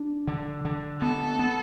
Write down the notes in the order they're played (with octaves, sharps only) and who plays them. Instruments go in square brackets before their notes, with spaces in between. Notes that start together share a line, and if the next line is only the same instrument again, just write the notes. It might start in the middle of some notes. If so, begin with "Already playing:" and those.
Already playing: [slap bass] D4
D3
D3
[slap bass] B3 [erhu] A4
[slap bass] B3